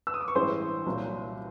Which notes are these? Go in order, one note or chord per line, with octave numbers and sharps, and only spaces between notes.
E6
D#6
D6
C#6
A1 G2 E3 G#3 C5 C6
C2 A#2 F#3